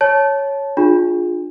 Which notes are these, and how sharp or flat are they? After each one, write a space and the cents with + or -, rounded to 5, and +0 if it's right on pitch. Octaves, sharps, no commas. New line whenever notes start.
C#5 +0 A5 -15
D4 +20 F4 +15 G#4 +0